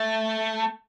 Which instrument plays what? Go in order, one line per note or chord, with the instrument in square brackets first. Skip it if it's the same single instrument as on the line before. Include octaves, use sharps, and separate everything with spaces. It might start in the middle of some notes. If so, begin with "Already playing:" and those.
Already playing: [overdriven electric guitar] A3